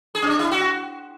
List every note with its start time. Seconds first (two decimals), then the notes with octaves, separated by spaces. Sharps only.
0.15 G#4
0.22 C#4
0.27 D4
0.39 E4
0.51 F#4